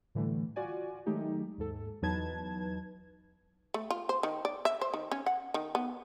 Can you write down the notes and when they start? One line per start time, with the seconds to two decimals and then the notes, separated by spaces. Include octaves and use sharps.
0.15 A2 D3 E3 G3 A3
0.56 F4 F#4 D5 G#5
1.06 D#3 F#3 G#3 A3 D#4 G4
1.58 D#2 G#2 A4
2.02 E2 F#3 D#4 B4 A5 G#6
3.74 A3
3.91 F4
4.09 C5
4.23 D#3
4.45 D5
4.65 E5
4.81 C5
4.94 D#3
5.11 C#4
5.26 F#5
5.54 D#3
5.75 B3